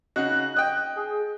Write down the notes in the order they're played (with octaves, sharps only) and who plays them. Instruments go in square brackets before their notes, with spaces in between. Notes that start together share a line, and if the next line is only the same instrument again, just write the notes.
[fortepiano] C#3 D#4 F#4 [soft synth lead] F#6
[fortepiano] D#5 G5
[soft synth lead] G#4